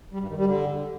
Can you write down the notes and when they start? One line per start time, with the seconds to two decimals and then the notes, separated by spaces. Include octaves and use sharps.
0.12 G3
0.21 G2
0.29 D#3
0.38 G3
0.46 D3